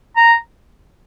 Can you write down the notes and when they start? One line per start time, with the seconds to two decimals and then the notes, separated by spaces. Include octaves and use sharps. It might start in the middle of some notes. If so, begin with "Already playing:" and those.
0.16 A#5